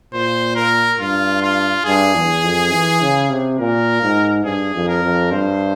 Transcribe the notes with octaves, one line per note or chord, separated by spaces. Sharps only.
A#2 C5
A#4
G2 F4
F4
G2 G#4
E2
F2
E3
C#3
C3
A#2 A#4
G#2
G2 G#4
F2
A#4
F2
G2 C5